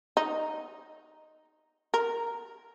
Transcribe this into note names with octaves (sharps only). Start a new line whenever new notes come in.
D#4
A#4